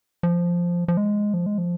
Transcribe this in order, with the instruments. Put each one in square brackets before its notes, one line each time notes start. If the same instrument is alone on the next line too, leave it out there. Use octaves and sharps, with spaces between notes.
[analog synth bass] F3
F3
G#3
F3
G#3
F3